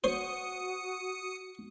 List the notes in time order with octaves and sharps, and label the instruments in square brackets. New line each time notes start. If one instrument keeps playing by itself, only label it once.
[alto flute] F#4 [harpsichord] C5 C#5 [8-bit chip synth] D#6 C#7